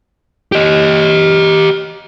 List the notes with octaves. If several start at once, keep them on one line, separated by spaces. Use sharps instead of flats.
G4 D#5